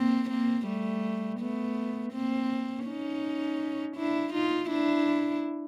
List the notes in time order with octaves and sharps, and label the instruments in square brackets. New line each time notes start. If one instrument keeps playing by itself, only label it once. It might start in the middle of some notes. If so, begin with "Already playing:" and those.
Already playing: [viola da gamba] A#3 C4
A#3 C4
G3 A3
A3 B3
A#3 C4
C#4 D#4
D4 E4
D#4 F4
D4 E4